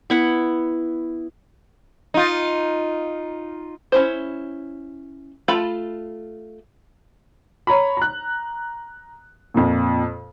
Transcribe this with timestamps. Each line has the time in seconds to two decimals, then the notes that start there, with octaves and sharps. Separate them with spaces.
0.10 B3 E4 F#5
2.14 D#4 F4
3.92 C#4 E4 C5
5.48 A3 F4 A4 F5 B5
7.67 C#5 A#5 B5
7.97 A#5 F#6
9.54 F2 A#2